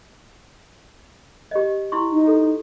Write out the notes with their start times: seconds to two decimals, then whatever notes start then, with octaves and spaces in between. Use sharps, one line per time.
1.51 G4 D#5
1.92 E4 C6 C#6
2.12 D#4
2.27 A4